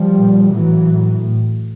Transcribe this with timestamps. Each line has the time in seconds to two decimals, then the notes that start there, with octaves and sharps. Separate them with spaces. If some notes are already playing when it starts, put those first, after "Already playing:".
Already playing: F3 G3
0.17 A#2
0.50 A2 E3 F#3
0.84 A2
1.18 A2